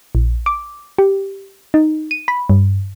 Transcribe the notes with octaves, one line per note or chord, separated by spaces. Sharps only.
A#1
D6
G4
D#4
D#7
B5
G2